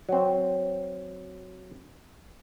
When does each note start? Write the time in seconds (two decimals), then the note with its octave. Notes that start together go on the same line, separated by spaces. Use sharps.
0.09 F#3 C4